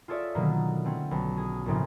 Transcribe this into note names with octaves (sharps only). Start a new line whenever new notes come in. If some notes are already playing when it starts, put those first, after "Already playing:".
F4 G#4 A4 C#5 D5 E5
B2 D3 D#3 F#3 A3 A#3
A3 C4 C#4
B1
G#4
A#1 A2 C#3 F3